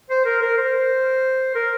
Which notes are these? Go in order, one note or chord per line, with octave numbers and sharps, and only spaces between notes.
C5
A#4
A#4
C5
A#4